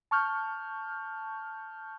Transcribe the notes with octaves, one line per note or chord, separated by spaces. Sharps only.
A5 C#6 F6 G6